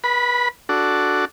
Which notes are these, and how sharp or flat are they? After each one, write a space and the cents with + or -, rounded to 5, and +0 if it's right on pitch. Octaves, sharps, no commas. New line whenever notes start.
B4 -30 B5 +0
D4 +0 F#4 +0 A4 +0